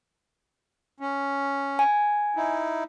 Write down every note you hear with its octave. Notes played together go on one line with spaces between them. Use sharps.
C#4
G#5
D#4 E4